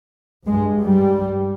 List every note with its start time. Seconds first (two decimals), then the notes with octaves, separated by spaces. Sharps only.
0.47 G2 G#3
0.82 G3